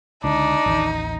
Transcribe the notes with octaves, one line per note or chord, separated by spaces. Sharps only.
C#2 D3 D4 D#4
A1 D#2 D#3